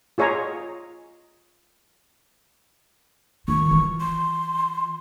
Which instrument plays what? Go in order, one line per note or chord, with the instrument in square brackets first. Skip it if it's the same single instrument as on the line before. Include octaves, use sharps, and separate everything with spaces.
[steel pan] F4 G#4 C#5 D#5 A#5
[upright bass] D#3 F4 [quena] C#6
[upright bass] E3 F4
[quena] C6